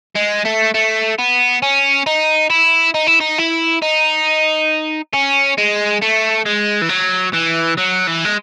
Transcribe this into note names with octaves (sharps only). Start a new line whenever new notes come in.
G#3
A3
A3
B3
C#4
D#4
E4
D#4
E4
D#4
E4
D#4
C#4
G#3
A3
G#3
E3
F#3
E3
F#3
E3
G#3